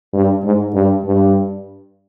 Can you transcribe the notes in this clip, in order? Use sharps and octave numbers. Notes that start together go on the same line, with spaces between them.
G2
G#2
G2
G2